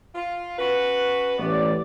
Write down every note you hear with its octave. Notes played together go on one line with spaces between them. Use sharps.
F4
C#4 F#4 B4
A1 B3 D5